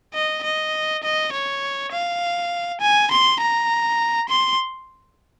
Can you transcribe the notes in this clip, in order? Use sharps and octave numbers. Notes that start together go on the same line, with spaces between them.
D#5
D#5
D#5
C#5
F5
G#5
C6
A#5
C6